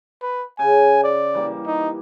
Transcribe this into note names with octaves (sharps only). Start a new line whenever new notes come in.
B4
C#3 G#5
D5
E3 G3 A#3
D#4